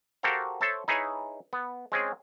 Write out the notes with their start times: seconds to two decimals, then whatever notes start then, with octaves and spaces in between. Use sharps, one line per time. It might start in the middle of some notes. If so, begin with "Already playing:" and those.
0.23 F#4 G4 A4 A#4 C5 F5
0.61 A4 C5 C#5 E5 A5
0.88 D#4 E4 G#4 B4 C#5
1.53 B3
1.92 G#3 C4 C#4 G#4